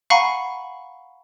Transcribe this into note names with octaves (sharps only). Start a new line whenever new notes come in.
F5 F#5 G#5 A#5 B5 C#6